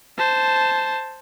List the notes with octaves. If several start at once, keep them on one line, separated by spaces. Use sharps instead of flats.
C5 A5